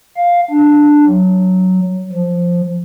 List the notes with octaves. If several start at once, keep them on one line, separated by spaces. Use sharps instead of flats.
F5
D4
F#3
F3